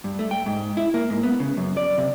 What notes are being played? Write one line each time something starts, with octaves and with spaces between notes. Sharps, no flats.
G2
A3
G5
G#2
E4
A#3
G#2
B3
C#3
F#2
D5
C3